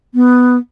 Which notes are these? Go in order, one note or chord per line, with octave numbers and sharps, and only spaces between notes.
B3